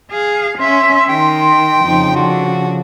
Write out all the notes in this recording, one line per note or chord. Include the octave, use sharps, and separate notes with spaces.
G#4 F5
C#4 E5 C6
D#3 G5
F2 C#3 F3 D#4
D3 F#4